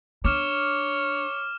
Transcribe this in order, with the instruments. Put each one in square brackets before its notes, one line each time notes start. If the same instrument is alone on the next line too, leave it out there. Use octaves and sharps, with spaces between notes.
[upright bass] D4 [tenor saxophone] C#5 [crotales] D6 F6 E7